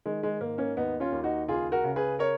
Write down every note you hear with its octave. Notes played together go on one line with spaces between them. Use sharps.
D#3 G#3
G#3
G#2 A#3
A#3 C#4
D#2 B3 D#4
C#4 F4
D#2
D#4 F#4
C#2 F4 G#4
F#4 A#4
C#3
G#4 B4
A#4 C#5